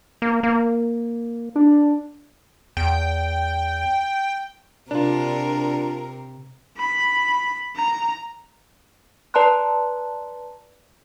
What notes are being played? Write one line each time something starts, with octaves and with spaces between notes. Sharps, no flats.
A#3
A#3
D4
E2 G5
C3 D4 F4 A#4
B5
A#5
B4 D5 A5 A#5 C6 F#6